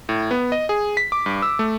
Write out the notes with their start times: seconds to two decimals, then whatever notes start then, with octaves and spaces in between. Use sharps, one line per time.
0.09 A2
0.31 B3
0.52 D#5
0.69 G#4
0.97 B6
1.12 D6
1.26 G2
1.42 E6
1.59 A3